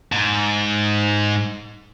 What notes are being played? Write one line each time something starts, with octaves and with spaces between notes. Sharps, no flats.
G#2